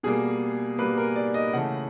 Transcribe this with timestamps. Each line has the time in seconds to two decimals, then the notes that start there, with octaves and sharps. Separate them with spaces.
0.03 B2 G3 A#3 G#4
0.78 B2 G3 A#3 B4
0.98 A#4
1.16 D5
1.34 D#5
1.53 C#3 E3 A3 F#5